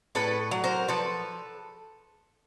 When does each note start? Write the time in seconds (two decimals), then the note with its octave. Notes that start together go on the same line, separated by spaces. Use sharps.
0.15 A2 A4 B4
0.51 F#3
0.64 A#4 C5
0.88 F3 A4 B4